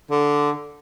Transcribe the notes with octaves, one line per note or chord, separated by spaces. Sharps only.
D3